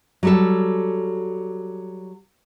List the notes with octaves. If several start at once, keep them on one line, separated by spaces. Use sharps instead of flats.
F#3 G3 A4